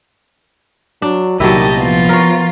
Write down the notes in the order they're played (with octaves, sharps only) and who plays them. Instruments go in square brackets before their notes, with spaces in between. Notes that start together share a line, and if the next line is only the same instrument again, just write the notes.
[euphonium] F#3 [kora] D4
[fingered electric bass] C2 A#2 [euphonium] D#3 [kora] F#3 E4 [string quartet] G4 D#5 A5
[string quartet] F3 F4 [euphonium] B3
[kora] A#4 C#5